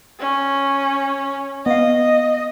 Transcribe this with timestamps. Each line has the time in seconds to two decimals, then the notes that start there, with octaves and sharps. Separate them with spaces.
0.20 C#4
1.66 B3 D#5 F5